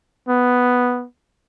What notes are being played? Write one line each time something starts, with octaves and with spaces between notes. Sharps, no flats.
B3